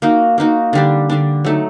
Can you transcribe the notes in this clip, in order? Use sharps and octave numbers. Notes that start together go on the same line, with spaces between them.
A#3 D#4 F#4
A#3 D#4 F#4
D3 G3 D4
D3 G3 D4
F#3 A3 D#4